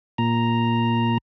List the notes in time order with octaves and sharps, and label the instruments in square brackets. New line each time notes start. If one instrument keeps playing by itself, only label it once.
[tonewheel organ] A#2 A#5